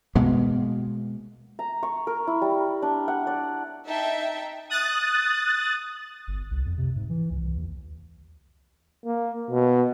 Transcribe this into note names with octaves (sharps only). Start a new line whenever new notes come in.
B2 G#3 A#3 B3
A#5
C#6
A#4
E4
G3
D4
F#5
D5
D#4 E5 G5 A5
D#6 F#6 A6
G1
C2
F2
C3
G#2
E3
C#2
C2
D#2
A#3
B2